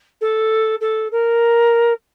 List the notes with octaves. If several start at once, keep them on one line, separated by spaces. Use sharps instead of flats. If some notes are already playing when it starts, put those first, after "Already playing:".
A4
A4
A#4